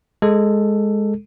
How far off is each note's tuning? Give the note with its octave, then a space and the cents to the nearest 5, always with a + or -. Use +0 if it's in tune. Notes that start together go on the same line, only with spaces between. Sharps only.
G#3 +0 A4 +10